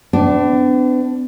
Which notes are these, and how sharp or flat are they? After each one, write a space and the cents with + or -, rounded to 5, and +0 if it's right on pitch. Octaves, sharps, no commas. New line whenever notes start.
B3 +45 D4 -5